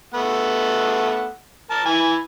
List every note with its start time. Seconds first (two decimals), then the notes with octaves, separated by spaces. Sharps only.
0.14 A3 B3 F#5
1.70 A#4 A5
1.86 E3 G#5